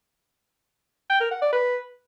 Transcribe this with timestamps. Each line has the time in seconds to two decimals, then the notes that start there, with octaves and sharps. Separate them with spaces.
1.10 G5
1.20 A#4
1.31 F#5
1.42 D5
1.53 B4